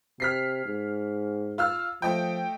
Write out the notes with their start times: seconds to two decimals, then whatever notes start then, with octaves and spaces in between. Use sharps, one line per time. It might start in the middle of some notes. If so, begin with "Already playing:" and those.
0.20 C3 F6 B6 C7
0.65 G#2
1.58 F4 E6 F6
2.02 F3 A3 D#5 G5